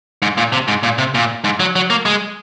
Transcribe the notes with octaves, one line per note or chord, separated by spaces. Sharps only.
G#2
A#2
C3
G#2
A#2
C3
A#2
G#2
F#3
F#3
A#3
G#3